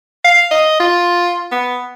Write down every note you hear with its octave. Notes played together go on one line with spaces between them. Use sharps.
F5
D#5
F4
B3